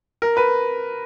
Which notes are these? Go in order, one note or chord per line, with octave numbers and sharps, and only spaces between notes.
A#4
B4